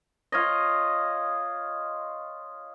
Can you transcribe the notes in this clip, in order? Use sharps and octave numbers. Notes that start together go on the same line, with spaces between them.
F4 C#5 D#5